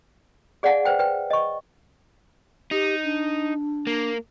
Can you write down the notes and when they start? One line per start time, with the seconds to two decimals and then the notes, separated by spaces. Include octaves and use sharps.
0.63 G#4 D5 F5 F#5 G#5
0.85 B4 C5 G5
0.99 B4 G5
1.30 D#5 C#6
2.71 D#4 G4
3.04 D4
3.87 A#3